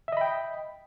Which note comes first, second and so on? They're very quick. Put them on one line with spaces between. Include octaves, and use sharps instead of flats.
E5 D#5 B5 G5